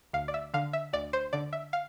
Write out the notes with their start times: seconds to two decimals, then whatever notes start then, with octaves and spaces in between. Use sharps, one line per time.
0.13 D2 F5
0.28 D5
0.34 E5
0.54 D3 F5
0.73 E5
0.93 D2 D5
1.13 C5
1.33 D3 D5
1.53 E5
1.73 F5